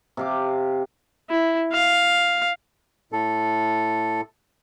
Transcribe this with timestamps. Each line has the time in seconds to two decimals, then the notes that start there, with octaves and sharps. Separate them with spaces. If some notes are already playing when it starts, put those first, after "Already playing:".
0.17 C3 F5 D6
1.30 E4
1.73 F5
3.12 A2 A4